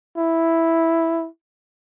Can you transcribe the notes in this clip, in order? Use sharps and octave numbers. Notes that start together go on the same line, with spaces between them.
E4